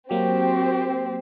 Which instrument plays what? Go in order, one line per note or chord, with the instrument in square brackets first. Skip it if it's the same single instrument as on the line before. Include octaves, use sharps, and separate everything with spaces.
[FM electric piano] F#3 A#3 [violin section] C4 [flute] F#4 [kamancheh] G4